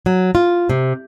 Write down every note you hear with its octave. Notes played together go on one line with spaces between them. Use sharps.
F#3
F4
C3